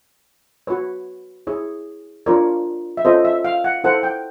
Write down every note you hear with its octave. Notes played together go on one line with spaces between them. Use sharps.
F#4 B4 C#5
E4 G#4 C#5
D4 F4 A#4 C#5 D5
E5
C#4 F4 A4 C5 D#5
E5
F5
F#5
E4 A4 C5 F#5
G5